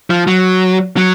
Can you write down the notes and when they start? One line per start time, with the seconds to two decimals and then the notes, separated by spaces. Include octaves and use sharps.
0.10 F3
0.27 F#3
0.97 F#3